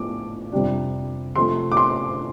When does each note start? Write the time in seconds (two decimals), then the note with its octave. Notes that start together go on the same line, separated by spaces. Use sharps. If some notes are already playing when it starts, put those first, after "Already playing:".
Already playing: A2 F3 B3 D4 D6
0.52 F2 C3 G3 D4
1.36 C3 F3 A3 C6
1.72 D6
1.77 C6